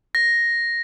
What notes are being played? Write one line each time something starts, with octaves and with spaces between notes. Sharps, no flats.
A#6